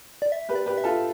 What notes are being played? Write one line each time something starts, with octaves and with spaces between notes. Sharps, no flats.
D5
E5
G4 B4
D5
G4 B4
E5
F4 A4